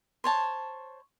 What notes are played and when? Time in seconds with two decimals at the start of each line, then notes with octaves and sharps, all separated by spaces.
0.24 C5 C#5 A5